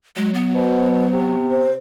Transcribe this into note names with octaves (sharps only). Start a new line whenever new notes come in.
F#3 G#3
B3
B2 C5
C3
C5